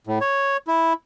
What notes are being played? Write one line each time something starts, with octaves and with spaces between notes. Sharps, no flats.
A2
C#5
E4